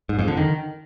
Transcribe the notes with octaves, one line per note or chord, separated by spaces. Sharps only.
G#2
F2
D3
D#3